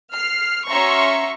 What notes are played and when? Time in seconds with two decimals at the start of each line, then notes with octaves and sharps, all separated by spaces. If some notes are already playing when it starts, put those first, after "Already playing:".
0.12 F6 C7
0.68 C#4 F#4 E5 A#5 C6 C#6